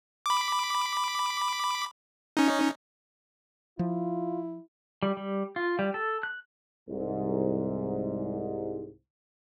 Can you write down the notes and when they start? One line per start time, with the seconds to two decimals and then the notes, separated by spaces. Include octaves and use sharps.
0.26 B5 D6
2.37 C#4 D#4
3.79 F3 E4 F4
5.03 G3
5.17 G3
5.56 F4
5.79 G3
5.94 A4
6.23 F#6
6.89 C2 G#2